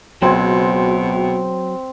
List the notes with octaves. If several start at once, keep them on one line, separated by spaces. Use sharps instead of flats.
C#2 B2 F#3 C4 C6 G#6